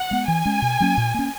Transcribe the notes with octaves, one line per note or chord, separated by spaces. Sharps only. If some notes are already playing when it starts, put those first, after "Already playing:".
Already playing: F#5
G#3 B3
E3 G#5
G#3 C#4
B2
F#3 A#3 C#4
A#2
A#3 C#4